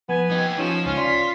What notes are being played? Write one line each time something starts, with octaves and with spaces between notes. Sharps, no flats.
F3 B3 G#5
D#4 G4
F3 C#4 D#4 F4 E7
C#2 C#4 F4 F6
D5 F5 C6 B6